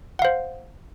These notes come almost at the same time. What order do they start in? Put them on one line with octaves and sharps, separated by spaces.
F#5 F5 C5